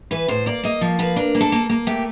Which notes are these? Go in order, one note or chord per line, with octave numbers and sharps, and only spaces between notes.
E3 B4
A2 C5
A#3 D5
A#3 D#5
F3
A#3 B4
D4 A#4
A#3
A4
A#3
A#3
A3 G4